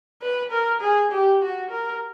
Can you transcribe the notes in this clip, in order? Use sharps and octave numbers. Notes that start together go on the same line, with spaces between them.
B4
A#4
G#4
G4
F#4
A#4